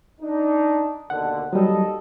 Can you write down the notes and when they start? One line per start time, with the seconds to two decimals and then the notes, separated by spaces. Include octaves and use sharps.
0.20 D4 D#4
1.10 D#2 B2 D3 F#5
1.53 D#2 F#3 G3 A4 D#5